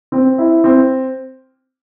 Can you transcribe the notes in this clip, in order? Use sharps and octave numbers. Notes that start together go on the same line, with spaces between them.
C4
E4
C4